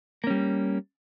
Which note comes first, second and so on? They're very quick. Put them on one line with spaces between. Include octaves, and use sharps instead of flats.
A#3 C#4 G3